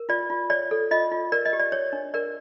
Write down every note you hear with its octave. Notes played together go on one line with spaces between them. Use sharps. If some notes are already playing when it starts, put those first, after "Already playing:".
Already playing: A#4
F4 D5
F4
C#5 D5
A4
F4 D#5
F4
A#4 D5
D#5
G4
D5
C#5
D4
A#4 D5